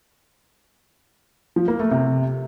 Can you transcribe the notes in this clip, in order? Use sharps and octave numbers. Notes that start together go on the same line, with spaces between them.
F3
A#3
A3
C3